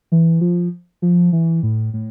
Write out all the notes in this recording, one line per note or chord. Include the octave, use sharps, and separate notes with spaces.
E3
F3
F3
E3
A2
A2